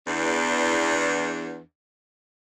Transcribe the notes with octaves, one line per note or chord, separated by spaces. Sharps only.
E2 D4